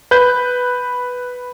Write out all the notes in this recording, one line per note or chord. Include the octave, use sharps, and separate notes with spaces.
B4 G6